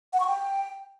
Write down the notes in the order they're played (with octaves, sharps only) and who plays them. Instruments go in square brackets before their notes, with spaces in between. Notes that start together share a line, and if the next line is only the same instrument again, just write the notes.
[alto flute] F#5
C#6
G5